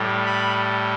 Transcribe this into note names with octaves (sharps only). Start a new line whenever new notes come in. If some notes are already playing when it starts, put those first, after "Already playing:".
Already playing: A2 G3
B5